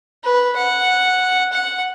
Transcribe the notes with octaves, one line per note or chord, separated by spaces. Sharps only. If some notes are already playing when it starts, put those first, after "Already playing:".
B4
F#5
F#5